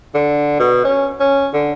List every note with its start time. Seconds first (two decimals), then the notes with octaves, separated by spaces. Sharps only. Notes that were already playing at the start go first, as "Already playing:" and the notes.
0.15 D3
0.60 B2
0.85 C#4
1.20 C#4
1.54 D3